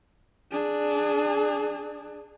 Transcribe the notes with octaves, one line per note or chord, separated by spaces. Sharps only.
D4 G#4